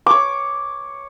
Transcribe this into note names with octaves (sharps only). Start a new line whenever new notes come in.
C#5 D6